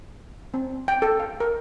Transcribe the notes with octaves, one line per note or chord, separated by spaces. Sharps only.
C4
G5
A4
F5
A#4